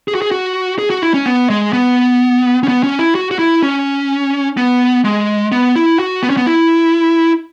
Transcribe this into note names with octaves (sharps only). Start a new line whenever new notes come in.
G#4
F#4
G#4
F#4
G#4
F#4
E4
C#4
B3
G#3
B3
C#4
B3
C#4
E4
F#4
F#4
E4
C#4
B3
G#3
B3
E4
F#4
B3
C#4
B3
E4